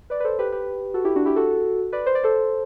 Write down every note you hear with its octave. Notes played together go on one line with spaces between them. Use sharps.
B4 D5
B4
A4 C5
G4 B4
G4 B4
F#4 A4
E4 G4
D4 F#4
E4 G4
F#4 A4
B4 D5
C5
D5
A4 C5